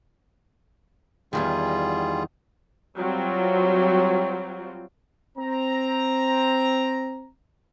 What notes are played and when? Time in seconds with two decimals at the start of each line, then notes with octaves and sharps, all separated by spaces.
1.33 E2 G#2 D#3 G3 F4 G#4
2.97 F#3 G3 C4 F4
5.38 C4 A#5